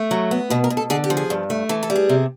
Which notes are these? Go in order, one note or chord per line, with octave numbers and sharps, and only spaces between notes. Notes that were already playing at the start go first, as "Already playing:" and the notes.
Already playing: A3
F#3
B3
B2 B4
A#4
B2
A4
D3 G#4
G4
F3
G#4
G2
A3
E3 A4
A4
G3
G#4
C3